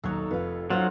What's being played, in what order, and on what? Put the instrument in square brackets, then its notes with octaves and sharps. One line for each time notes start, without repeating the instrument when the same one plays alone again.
[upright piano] D#1 B1 F#6 [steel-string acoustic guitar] F#3 D#4 [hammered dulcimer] A4 C#5
[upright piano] F1 F2 [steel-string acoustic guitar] F4 B4
[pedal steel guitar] F#3 [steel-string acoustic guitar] C#4 D#4 C5 [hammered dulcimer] F4 F5